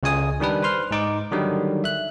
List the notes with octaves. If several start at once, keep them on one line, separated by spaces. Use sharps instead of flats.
C#2 C#3 G#3 G#5 D#6
D#3 G3 D4 B4
B4 C5 C6 F6
G#2 D#4 D6
D3 D#3 F#3 G3
E5 F#6